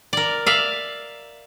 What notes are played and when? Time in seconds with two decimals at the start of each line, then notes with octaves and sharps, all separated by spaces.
0.13 A#4 D5
0.46 D5 E5 F5